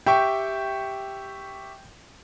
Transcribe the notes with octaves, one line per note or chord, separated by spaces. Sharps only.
G4 E5 G5 C#6